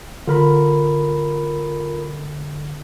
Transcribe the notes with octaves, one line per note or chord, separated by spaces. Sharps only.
D3 F4 A#4 B5